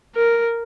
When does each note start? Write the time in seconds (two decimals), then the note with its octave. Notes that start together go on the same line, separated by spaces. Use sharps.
0.16 A#4